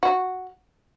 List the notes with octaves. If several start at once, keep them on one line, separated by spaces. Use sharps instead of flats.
F#4